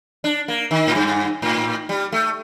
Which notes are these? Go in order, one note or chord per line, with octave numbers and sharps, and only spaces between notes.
D4
A#3
D#3
A2
G2
A2
G3
A3